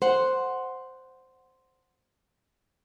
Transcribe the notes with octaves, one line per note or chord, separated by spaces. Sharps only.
C5 F#5